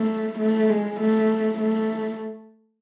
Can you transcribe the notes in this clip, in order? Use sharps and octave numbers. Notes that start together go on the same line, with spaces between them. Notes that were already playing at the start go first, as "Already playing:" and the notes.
Already playing: A3
A3
G#3
A3
A3